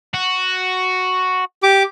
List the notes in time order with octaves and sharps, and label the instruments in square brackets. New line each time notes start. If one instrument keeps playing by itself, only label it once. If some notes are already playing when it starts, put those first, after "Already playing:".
[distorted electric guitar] F#4
[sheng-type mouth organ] G4 D6